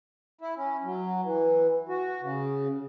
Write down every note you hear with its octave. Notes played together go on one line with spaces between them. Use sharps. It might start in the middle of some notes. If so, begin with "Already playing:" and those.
E4
C#4
F#3
E3
F#4
C#3